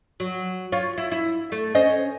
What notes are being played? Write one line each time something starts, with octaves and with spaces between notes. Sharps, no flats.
F#3
F4 C#5
E4
E4
A3
C#4 C5 D#5